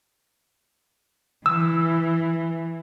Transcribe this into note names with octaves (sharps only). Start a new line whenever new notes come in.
E3 E6